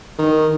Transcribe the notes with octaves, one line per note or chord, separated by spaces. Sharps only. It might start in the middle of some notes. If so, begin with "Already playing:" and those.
D#3